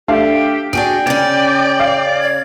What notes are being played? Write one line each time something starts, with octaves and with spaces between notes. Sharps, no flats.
A3 D4 G4 F5
D4 F#4 G#4 G5 D7
C#3 C#4 D5
F5
G#6